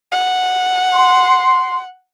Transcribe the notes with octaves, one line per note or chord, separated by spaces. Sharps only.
F#5
C6